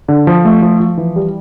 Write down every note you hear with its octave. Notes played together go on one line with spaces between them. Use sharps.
D3
F3
A3
F3
F3
E3
G3